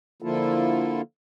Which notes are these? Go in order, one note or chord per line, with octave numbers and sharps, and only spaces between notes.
D3 F3 A#3 E4 F4 A4